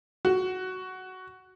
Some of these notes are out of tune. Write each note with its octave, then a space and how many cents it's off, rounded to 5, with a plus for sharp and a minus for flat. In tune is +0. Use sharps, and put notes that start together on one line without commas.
F#4 +5